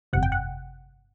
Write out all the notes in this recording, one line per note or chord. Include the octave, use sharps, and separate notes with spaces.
G1 F2 C3 F#5
G5
F#5